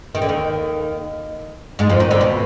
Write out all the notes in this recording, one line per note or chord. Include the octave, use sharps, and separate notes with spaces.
D#3
D3
D#2 D#3
G#2 G#3
F2 F3
D#2 D#3
D2 D3
B2